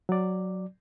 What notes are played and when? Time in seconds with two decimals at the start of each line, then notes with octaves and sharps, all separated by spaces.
0.09 F#3 D5